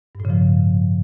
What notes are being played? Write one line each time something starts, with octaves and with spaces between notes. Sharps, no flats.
G2
A2
C#3
F3